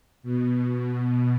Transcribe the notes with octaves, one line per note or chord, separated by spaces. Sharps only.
B2